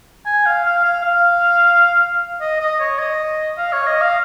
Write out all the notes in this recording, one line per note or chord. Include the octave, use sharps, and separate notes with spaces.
G#5
F5
F5
F5
F5
D#5
D#5
C#5
D#5
F5
C#5
D#5
F5